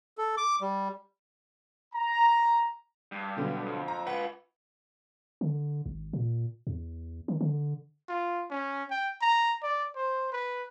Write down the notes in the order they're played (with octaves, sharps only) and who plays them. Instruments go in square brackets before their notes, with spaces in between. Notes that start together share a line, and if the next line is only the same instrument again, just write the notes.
[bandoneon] A4
D6
G3
[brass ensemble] A#5
[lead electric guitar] G2
[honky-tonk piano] B2 D3 F#3
[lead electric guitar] F2
[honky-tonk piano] A#5
[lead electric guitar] F4 B4 [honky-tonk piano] F#5
[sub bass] D3
G#1
A#2
E2
D#3
D3
[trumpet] F4
C#4
G5
A#5
D5
C5
B4